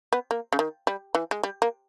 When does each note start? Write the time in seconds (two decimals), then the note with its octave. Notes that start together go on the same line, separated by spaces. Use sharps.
0.13 B3
0.31 A#3
0.53 C#3
0.59 D#3
0.87 G3
1.15 E3
1.31 G#3
1.43 G3
1.62 A#3